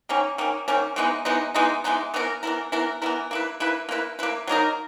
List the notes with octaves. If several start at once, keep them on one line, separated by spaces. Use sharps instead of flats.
D#3 A#3 C#4
D#3 A#3 C#4
D#3 A#3 C#4
E3 G#3 B3 D#4
E3 G#3 B3 D#4
E3 G#3 B3 D#4
E3 G#3 B3 D#4
E3 B3 E4 A#4
E3 B3 E4 A#4
E3 B3 E4 A#4
E3 B3 E4 A#4
A#3 E4 B4
A#3 E4 B4
A#3 E4 B4
A#3 E4 B4
F#3 A#3 D#4 A#4